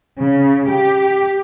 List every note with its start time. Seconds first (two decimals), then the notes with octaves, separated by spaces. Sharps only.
0.20 C#3
0.71 G4